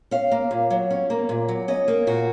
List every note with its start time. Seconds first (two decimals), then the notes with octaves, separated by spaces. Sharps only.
0.11 C#4 F5
0.31 A#3
0.51 A#2
0.70 F#3
0.91 C#4
1.10 A#3
1.29 A#2
1.48 F#3
1.68 C#4 D#5
1.88 A#3
2.07 A#2 F#4